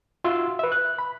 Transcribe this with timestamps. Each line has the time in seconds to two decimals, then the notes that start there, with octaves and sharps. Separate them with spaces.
0.24 F4 F#4 E5 C6 E6
0.59 B4 E5
0.72 F#6
0.99 B5